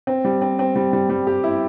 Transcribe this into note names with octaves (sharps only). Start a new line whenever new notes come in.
C4
G3
C4
C4
G3
G3
G3
G4
E4